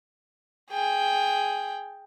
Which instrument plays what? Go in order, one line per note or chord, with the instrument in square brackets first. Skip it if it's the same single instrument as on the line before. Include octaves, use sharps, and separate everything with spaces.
[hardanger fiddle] G#4 G5